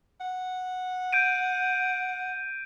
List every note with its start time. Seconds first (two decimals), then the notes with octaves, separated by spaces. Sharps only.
0.21 F#5
1.13 G6 D7 D#7